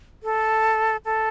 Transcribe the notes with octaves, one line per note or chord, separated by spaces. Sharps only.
A4
A4